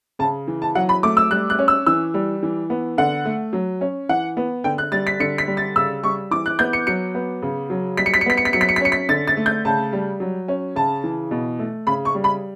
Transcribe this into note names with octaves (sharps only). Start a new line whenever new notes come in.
C#3 A5
E3
A5
F#3 F#5
B5
A3 D6
E6
G3 F#6
F#6
C#4
E6
E3 E6
G3
E3
B3
D3 F#5
A3
F#3
C#4
E3 F#5
B3
D3 G5
F#6
G3 A6
B6
D3 C#7
B6
G3
A6
C#3 E6
G3 C#6
E3 D6
F#6
B3 G6
C#7
F#3 C#7
B3
C#3
F#3
G3 B6
C#7
B6
C#7
B3 B6
C#7
B6
F#3 C#7
B6
C#7
B6
C#4 C#7
B6
D3 A6
A6
A3
G6
C#3 A5
G3
F#3
C#4
C#3 A5
E3
B2
A3
C#3 B5
C#6
G3
B5